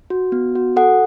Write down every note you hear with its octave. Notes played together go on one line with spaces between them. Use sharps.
F#4
B3
F#4
A4 F#5